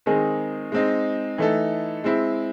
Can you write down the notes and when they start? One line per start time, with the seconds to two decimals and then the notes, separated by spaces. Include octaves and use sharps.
0.06 D#3 G#3 C4 D#4 G#4
0.72 G#3 C4 D#4
1.38 E3 A3 D#4 A4
2.04 G#3 C4 E4